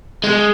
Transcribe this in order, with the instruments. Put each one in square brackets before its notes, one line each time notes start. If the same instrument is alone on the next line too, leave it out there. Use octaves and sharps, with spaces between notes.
[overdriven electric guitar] G#3